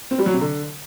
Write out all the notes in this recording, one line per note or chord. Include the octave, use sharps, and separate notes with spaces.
C4
G3
F#3
C3
D3